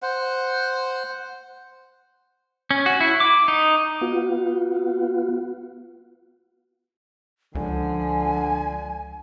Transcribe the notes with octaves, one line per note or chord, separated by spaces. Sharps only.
C5 F#5
C#4
F#4
E4
D6
D#4
B3 F4 F#4
C#2 D3 F3 G#5